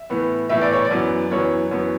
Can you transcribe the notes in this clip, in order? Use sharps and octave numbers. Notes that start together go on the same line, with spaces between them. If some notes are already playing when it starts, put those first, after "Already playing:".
Already playing: E5
A2 E3 B3
A2 E3 B3 E5
D5
C#5
D5
F#2 E3 B3
F#2 E3 B3 C#5
F#2 E3 B3